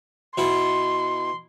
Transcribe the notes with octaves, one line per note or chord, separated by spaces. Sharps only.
B2 E4 C6